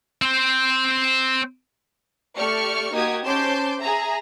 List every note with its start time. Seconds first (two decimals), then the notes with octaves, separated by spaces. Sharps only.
0.22 C4 C5
2.38 A3 G4 D5 C#6 F6 C#7
2.93 A#3 D#4 F#4 G4 D#6 G#6
3.25 C#4 C5 A5 C6 D6 G6
3.80 G#4 E5 A#5